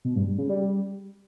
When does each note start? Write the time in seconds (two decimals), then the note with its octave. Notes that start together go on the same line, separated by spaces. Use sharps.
0.05 B2
0.16 G2
0.27 G2
0.38 C#3
0.49 G3